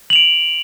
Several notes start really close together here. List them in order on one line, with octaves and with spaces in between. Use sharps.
F#7 F7 D7